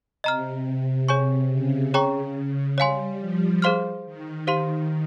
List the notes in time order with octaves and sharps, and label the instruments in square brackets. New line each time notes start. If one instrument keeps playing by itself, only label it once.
[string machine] C3 [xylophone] D#5 A#5 F6
[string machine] C3 [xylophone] G#4 C#5 G#5 C#6 G6
[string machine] C#3
[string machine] C#3 [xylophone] G#4 C#5 G5 A#5 C#6
[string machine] G3 [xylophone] C#5 F5 G#5 C6
[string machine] F3
[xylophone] G#4 C5 F5 C6 F6
[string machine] D#3
[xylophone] G4 C5 F5 C6